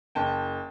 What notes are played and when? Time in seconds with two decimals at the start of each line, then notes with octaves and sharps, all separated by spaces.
0.15 F#1 G5 A5